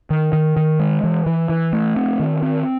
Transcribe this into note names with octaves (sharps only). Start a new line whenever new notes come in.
D#3
D#3
D#3
G#3
E3
E3
E3
A3
C4
D#3
C4